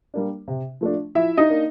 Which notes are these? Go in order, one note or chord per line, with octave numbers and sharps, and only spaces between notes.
G3 A#3 D4
C3
F3 A3 D4
F3 E4 E5
D#4 D#5
A#3 D4